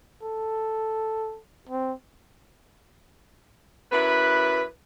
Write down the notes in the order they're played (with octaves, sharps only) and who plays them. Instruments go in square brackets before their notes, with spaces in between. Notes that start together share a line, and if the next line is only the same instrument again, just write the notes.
[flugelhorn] A4
C4
[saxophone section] F#2 E4 B4